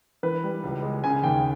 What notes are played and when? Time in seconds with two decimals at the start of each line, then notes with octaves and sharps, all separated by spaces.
0.23 E3 B4
0.44 G3
0.64 C#2
0.83 G#3
1.04 C#3 G#5
1.23 D#2 G5